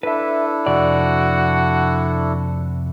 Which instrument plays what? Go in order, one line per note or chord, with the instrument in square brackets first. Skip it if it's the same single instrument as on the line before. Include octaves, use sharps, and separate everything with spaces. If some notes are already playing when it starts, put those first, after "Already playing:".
[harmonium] D4 E4 A4 [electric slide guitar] B4 E5
[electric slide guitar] F2 C3 D5 [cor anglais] F#4